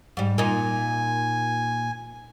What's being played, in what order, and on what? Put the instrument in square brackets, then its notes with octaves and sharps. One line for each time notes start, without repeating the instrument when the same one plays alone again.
[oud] G#2 G3
[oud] A#2 D#4 [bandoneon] G#5